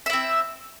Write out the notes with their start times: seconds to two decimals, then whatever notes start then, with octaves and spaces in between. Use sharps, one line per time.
0.06 E5
0.10 E4
0.13 C4